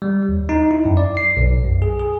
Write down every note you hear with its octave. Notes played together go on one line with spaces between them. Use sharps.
G3
D#2
D#4
E4
F#2
D5
C7
B1
F#2
G#4
G#4